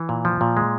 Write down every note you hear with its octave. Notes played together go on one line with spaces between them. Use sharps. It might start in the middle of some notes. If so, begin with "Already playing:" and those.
Already playing: E3
A#2
F3
A#2
G#3